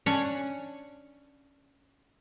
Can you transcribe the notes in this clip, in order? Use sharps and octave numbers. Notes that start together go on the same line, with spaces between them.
C#4 D4 C#5 F#5